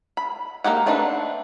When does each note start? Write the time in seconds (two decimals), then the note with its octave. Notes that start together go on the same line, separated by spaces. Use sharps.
0.17 B5
0.64 A#3 D#4 G4 F#5
0.86 A3 C4 D4 D#4 B4